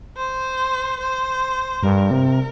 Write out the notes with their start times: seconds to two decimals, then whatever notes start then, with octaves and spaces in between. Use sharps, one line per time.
0.17 C5
1.00 C5
1.83 G2 A#4
2.11 C3